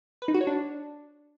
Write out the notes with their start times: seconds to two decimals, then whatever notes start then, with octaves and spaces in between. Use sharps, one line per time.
0.22 B4
0.28 D#4
0.34 F#4
0.41 C#5
0.47 D4